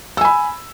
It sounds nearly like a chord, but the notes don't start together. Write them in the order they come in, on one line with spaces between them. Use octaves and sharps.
E6 G#5 B5